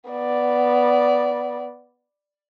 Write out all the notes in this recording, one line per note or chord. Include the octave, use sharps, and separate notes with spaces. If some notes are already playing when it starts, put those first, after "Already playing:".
B3 D5